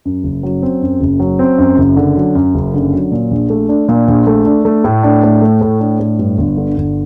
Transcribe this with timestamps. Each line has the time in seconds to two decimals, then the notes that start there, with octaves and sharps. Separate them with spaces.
0.05 F#2
0.24 F#1
0.43 F#3
0.62 C4
0.82 F#2
1.00 F#1
1.20 F#3
1.39 C4
1.58 F#2
1.77 F#1
1.96 D3
2.16 F#3
2.35 F#2
2.55 F#1
2.74 D3
2.92 F#3
3.11 A#2
3.31 A#1
3.50 A3
3.69 D4
3.88 A#2
4.08 A#1
4.27 A3
4.46 D4
4.65 A3
4.84 A2
5.03 D4
5.23 A2
5.42 A3
5.61 A2
5.80 D4
6.00 A2
6.19 G2
6.38 G1
6.57 D3
6.77 G1